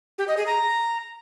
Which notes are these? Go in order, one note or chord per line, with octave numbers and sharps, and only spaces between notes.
G4
D#5
G#4
A#5